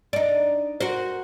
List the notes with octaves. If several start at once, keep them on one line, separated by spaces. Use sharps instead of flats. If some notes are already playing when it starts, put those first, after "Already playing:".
D4 D#4
F#4 A#4 C5